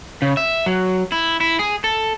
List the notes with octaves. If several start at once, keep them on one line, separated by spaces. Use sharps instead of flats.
C#3
E5
F#3
E4
E4
G#4
A4